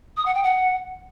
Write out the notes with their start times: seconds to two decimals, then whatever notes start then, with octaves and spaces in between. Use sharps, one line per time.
0.17 D#6
0.25 F#5
0.34 G5
0.43 F#5